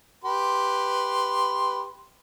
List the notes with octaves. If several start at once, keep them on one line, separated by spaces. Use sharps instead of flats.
G4 B4 C6